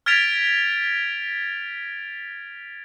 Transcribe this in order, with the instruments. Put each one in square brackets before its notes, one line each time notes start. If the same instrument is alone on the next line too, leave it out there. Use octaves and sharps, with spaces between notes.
[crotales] F6 G#6 A6 B6 D7 F7